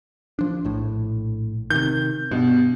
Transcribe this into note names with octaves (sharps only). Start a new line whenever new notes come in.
F3 D4
A#1 A2
C3 D#3 G6
G2 B2